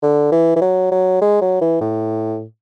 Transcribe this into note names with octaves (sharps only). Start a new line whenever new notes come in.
D3
E3
E3
F#3
F#3
G#3
F#3
E3
A2